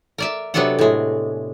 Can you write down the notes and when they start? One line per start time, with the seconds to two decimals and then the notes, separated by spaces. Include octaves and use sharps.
0.18 A#4 D5 E5
0.54 C3 F#3 B3 D4 A4 F#5
0.79 A2 G#3